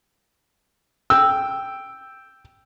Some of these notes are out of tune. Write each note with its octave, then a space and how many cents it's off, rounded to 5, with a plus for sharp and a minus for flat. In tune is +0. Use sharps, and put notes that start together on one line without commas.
G5 +0 E6 +0